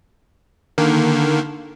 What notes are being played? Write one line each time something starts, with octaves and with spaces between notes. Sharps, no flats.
D3 D#3 A#3